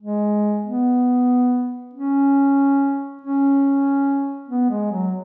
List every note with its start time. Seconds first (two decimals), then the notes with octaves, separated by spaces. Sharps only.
0.02 G#3
0.66 B3
1.94 C#4
3.22 C#4
4.49 B3
4.70 G#3
4.92 F#3